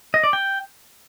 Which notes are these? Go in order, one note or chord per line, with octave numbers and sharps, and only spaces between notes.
D#5
D5
G5